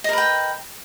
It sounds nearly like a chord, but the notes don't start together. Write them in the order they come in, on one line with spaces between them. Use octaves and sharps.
D#5 A#4 B4 G5